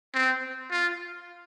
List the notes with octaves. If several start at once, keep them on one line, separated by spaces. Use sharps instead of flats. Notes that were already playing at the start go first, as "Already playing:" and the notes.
C4
F4